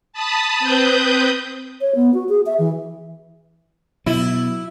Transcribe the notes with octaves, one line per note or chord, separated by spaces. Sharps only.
A5 B5 D#6
C4 B4 D#6 G6
C#5
B3
F#4
G#4
E5
E3
B2 F#3 E4